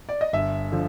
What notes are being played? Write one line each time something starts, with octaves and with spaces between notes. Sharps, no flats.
D5
D#5
G1 E5
D3 F3